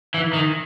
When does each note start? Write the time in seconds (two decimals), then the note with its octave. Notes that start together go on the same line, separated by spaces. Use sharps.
0.14 E3
0.33 D#3